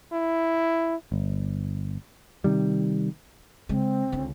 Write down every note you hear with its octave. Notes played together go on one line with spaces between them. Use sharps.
E4
G1
C3 D#3 G3
C#3 G#3 C4
C#2 D3